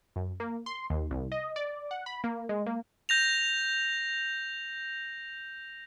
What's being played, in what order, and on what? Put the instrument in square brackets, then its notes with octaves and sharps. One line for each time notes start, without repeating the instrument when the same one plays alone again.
[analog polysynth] F#2
A#3
C6
D#2
C2
D#5
D5
F#5
B5
A#3
G#3
A#3
[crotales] G6 A#6 F7